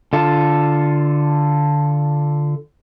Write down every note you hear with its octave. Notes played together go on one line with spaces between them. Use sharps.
D3 F4 A4